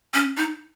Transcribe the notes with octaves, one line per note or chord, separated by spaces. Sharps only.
C#4
D#4